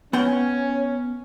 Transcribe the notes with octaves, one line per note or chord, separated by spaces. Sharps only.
B3 C#4 F#5 G5